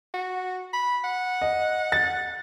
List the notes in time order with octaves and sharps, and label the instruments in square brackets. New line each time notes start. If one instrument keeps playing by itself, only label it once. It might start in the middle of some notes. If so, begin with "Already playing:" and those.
[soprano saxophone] F#4
B5
F#5
[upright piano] D#5
A6